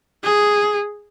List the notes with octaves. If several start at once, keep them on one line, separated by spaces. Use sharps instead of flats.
G#4